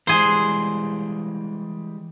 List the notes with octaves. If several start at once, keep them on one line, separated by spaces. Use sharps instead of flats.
E3 G3 G#3 G#4 C5